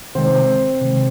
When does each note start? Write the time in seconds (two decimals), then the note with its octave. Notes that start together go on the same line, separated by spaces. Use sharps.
0.15 C3 D#3 G#3 C4 C5
0.82 C3 D#3 G#3